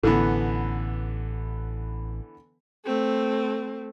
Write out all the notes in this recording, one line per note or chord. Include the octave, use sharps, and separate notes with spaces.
A1 D3 E3 B3
A3 C4